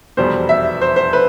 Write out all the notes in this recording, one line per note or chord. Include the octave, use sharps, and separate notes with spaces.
F1 E2 B2 G3 C5
E5
C5
C5
B4